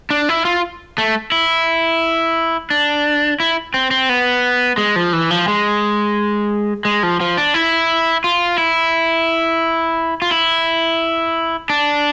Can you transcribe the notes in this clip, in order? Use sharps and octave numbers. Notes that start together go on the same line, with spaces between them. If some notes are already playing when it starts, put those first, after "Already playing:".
D4
E4
F4
A3
E4
D4
E4
C4
C4
B3
G#3
F3
E3
F3
G#3
G#3
F3
F3
D4
E4
F4
E4
F4
E4
D4